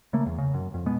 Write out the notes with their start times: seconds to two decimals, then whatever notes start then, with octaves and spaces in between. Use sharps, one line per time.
0.13 C#3 A3 A#3
0.26 E2
0.38 C#3
0.54 F#2
0.74 F2
0.86 B2 G#3 B3